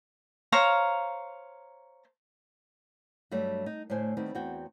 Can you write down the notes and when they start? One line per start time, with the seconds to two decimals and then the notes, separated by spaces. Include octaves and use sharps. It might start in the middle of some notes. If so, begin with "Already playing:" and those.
0.52 C5 C#5 F5 A#5
3.31 G2 F#3 G3 A3 E5
3.66 D#4
3.90 A2 D3 A3 C5 G#5
4.17 D#3 G3 A3 B3 C4
4.35 E2 C4 F#4 G5